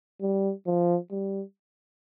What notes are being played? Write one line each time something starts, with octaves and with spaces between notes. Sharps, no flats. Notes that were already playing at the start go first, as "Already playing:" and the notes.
G3
F3
G3